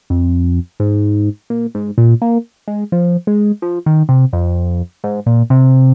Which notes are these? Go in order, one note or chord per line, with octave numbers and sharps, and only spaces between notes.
F2
G#2
A#2
G#2
A#2
A#3
G#3
F3
G#3
F3
D#3
C3
F2
G#2
A#2
C3